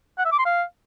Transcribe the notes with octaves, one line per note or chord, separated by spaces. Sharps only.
F#5
E5
D6
C6
F5